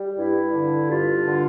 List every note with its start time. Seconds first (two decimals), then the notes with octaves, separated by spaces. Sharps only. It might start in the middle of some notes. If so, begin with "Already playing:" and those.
Already playing: G3
0.17 G2 E4
0.53 D3
0.89 G2 F4
1.26 D3